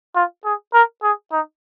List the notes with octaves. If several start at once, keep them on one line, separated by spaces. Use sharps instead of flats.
F4
G#4
A#4
G#4
D#4